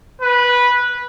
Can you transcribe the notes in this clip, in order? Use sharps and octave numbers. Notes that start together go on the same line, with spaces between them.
B4